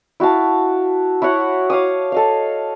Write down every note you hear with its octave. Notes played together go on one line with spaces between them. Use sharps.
E4 F#4 F5 A5
E4 F#4 C#5 F#5
C#5 F5 D6 D#6
A4 D#5 F5